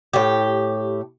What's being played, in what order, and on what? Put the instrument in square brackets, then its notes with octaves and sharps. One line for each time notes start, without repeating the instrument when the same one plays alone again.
[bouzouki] A2 G4